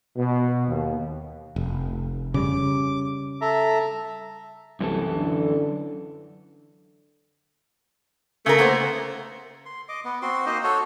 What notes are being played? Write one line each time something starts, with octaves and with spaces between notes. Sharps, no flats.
B2
D#2
F1
C#3 G3 C#4 D6
A4 E5 A#5
C2 F#2 E3 A4
D3
C#3 A3 A#4
A#3 B3 C5
C6
D#5 D6
B3
C4 F#4 C6
A#3 D#4 C5 D#5
F#4 A4 C#5